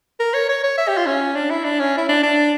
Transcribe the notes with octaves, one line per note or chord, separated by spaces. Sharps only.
A#4
C#5
C#5
C#5
E5
G4
F4
C#4
D4
E4
D4
C#4
E4
D4
D4